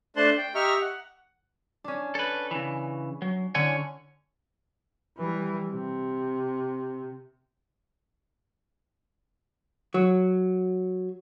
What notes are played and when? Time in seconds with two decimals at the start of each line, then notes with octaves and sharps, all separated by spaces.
0.16 A3 D4 C5 A5 C6 F#6
0.38 G5
0.55 G4 D#5 E5 A#5 C#6 F6
0.81 F#5
1.84 C#4 D4
2.15 A4 B4
2.51 C#3 E3
3.22 F#3
3.55 D3 C#4 C#5 F#5 G#5
5.18 E3 G3
5.71 C3
9.94 F#3